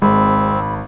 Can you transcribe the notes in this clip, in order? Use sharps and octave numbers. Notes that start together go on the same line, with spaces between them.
G#1 G#3 C4 B5